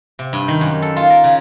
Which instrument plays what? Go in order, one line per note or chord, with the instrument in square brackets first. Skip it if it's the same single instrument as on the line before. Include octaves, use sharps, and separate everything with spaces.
[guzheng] C3
G2
D#3
F#2
A4
F4
A#4
C#3